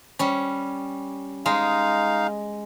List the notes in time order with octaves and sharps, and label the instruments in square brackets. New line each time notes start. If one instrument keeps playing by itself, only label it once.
[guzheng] G3 C#4
[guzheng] G#3 [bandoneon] D#4 F5